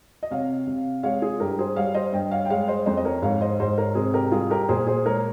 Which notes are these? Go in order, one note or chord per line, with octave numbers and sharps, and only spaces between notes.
D#5
C3 C#5 F5
C3
G#3 C#5 F5
F4 G#4
G2 G4 A#4
G#4 C5
G3 C#5 F5
C5 D#5
G2 D#5 G5
C#5 F5
G5
G#3 C#5 F5
C5 D#5
F2 C5 D#5
D#5
A#4 C#5
G#2 C#5 F5
C5 D#5
G#2 C5 D#5
A#4 C#5
C3 G#4 C5
G4 A#4
G3 F4 G#4
G4 A#4
A#2 G#4 C5
G#4 C5
G#3 A#4 C#5